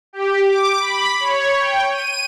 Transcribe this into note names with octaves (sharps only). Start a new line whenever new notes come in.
G4
D6
B5
C#5
G5
D#7